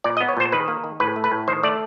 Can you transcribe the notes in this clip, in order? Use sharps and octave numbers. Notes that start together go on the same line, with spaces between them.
A#2 D5
D#5
B3
C#5
A#2 C5
D#3 B4
A#3
D#3
A2 B4
A3
B4
A2
D#3 C5
A3 D5